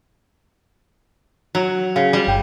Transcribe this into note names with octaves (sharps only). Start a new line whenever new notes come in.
F#3
C#3 F5
G3
G1 G2 G5